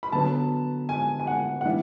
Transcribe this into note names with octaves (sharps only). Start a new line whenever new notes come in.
B5
D3 F#3 B3 A5
G#5
G#5
F#5
F#5
E3 B3 D4 E5